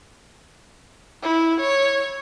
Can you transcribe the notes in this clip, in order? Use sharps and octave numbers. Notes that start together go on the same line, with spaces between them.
E4
C#5